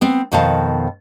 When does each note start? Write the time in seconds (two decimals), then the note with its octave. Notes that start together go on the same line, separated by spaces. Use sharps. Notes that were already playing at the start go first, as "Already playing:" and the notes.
0.01 B3 C4
0.32 F2 B2 D#3 C5 F5 A5